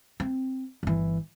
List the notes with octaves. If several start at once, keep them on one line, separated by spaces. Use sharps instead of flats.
C4
G1 E3